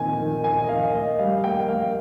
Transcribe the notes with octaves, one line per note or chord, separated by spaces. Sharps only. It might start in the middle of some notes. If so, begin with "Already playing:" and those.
Already playing: A#2 D#3 C4 G#5
D#3
D#3 G#5
D#5
D#3 F5
A#3 D#5
G3 F5
A#3 G5
A#3 F5